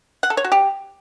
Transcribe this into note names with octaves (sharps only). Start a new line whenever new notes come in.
F#5
A4
C#5
F#4
G4